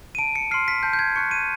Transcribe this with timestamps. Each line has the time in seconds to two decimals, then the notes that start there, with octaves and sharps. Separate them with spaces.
0.15 D#7
0.19 A5 D7
0.36 C#7
0.51 C6 F6 C7
0.68 B6
0.83 A5 G6
0.93 G6
0.99 G#6
1.16 C#6 F#6 C#7
1.31 D#7